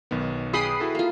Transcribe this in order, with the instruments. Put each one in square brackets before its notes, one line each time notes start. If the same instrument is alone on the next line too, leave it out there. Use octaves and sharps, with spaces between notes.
[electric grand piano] B1 D#3 B3
[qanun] G#4 B4 G5 [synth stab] B5 D#6 C7
[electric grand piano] E4 F#4 A4
[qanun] A#3 F4